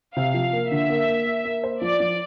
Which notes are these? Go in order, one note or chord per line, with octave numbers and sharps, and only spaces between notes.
C3 F5
F3
A#3
D3 E5
A#3
A#3
A#3
A#3
C5
F3 D5
F3